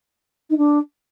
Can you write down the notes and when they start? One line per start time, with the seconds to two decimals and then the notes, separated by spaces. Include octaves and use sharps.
0.50 D#4
0.57 D4